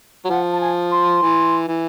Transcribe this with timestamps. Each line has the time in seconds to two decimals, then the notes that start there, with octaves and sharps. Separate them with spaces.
0.25 F#3
0.30 F3 F#5
0.53 A5
0.61 G#5
0.91 C6
1.22 E3
1.68 E3